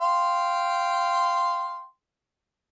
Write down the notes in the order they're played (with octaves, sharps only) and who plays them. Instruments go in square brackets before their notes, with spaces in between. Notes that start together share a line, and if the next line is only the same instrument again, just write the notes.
[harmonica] F5 G5 C6